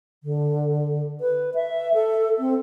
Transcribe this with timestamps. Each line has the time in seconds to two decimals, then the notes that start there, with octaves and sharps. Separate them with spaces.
0.24 D3
1.21 B4
1.55 E5
1.94 A4
2.39 C4